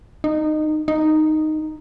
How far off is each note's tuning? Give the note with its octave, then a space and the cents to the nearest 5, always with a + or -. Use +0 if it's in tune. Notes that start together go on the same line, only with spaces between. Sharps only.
D#4 -20
D#4 -5